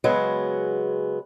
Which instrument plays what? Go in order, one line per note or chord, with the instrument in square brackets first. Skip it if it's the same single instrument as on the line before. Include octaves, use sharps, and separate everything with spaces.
[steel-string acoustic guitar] C#3 F#3 G#3 B3